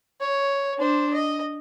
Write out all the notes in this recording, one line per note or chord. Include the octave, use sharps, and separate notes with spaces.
C#5
D4 C5
D#5